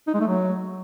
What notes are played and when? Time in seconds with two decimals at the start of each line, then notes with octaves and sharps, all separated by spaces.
0.08 D#4
0.14 G#3
0.21 A3
0.27 F#3